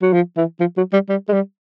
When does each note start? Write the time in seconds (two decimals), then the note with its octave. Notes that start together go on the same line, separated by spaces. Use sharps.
0.02 F#3
0.13 F3
0.37 E3
0.60 F3
0.77 F#3
0.93 G3
1.09 G3
1.28 G#3
1.33 G3